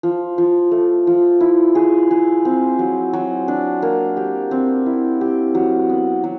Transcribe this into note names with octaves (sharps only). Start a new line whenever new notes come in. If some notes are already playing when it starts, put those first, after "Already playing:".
F3
F3
A3
F3
E4
G#4
G#4
C4
F#3
F#3
D4
A#3
G4
C4
E4
G4
F#3
B3
F#3